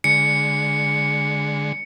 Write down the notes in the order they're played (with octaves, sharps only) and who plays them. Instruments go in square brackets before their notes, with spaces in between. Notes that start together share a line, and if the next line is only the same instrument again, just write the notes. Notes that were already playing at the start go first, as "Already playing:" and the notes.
[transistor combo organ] D3 G#3 [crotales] C#7